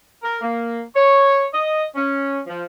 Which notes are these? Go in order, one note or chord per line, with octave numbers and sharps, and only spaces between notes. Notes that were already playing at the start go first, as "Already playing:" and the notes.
A#4
A#3
C#5
D#5
C#4
F3